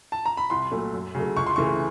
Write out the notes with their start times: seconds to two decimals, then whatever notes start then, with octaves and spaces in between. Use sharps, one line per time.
0.12 A5
0.26 A#5
0.37 B5
0.50 C2 C6
0.71 A#2 F#3 A3
0.94 F#2
1.15 C#3 F#3 A3
1.37 C#2 C#6
1.47 C6
1.56 C#3 E3 A3 C#6